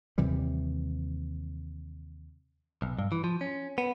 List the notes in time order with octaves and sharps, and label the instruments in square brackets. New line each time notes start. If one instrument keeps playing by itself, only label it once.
[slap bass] D#2 C3 E3 G3
[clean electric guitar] B1
G2
E3
F3
C#4
B3